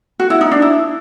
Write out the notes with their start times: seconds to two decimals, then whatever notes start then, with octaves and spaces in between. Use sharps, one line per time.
0.20 F#4
0.30 E4
0.41 D#4
0.51 D4
0.62 E4